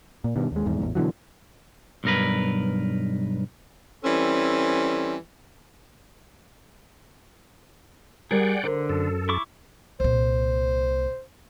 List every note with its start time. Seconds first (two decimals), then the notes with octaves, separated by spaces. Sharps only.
0.24 A#2
0.36 G2 B2 D#3
0.52 D#2 G#3
0.66 D#1 E2 G#2
0.83 A1 E2
0.95 B2 D3 E3 F#3
2.04 B1 G2 A#4 B4
4.04 E3 G3 C4 C#4 A4
8.31 G3 G#4 A#4 D5 F#5 G5
8.64 D3 A#4 C5
8.89 F#2 A4
9.29 E4 C#6 D6
10.00 C2 A#2 C5